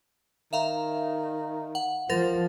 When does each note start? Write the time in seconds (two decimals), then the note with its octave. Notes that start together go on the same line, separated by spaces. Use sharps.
0.53 D#3 E5 F5 A#5
1.75 F#5
2.10 F3 A#4 C5 A6